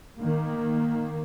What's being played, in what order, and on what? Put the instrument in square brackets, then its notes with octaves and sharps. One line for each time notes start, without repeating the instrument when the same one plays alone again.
[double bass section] D#3 A#3